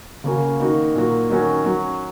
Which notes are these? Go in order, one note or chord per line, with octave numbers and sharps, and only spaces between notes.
C#3 A#3 C#4 F#4
D#3 A#3 D#4 F#4
A#2 F#3 A#3 F#4
D#3 F#3 C#4 F#4
F#3 C#4 F#4